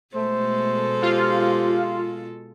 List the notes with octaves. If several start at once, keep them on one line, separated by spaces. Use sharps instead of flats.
B2 G#3 A3 A4 C5
F4 G4